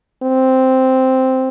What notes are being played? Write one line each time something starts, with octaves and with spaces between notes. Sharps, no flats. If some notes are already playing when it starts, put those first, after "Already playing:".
C4